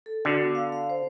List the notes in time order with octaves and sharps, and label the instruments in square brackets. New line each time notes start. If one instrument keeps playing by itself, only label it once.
[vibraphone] A4
[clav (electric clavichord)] D3 [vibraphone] F#4
[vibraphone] B3
F5
F5
C5